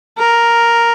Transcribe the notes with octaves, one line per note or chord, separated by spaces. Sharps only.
A#4